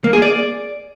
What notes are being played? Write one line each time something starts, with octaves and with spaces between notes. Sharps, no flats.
A#3
G#4
D5